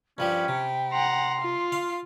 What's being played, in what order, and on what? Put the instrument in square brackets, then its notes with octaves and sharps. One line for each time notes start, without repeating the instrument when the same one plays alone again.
[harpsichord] G2 F3 G3 [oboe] C#4 [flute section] G5 B5
[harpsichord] C3
[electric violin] F#5 A#5 [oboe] C6
[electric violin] F4
[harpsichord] F5